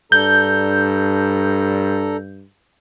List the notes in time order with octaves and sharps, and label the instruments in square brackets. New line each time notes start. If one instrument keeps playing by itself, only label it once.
[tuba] G2 [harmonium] D4 A4 A#5 [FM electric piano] G6